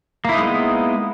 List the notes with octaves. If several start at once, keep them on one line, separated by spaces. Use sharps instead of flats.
G#3 A#3 B3 D#4 E4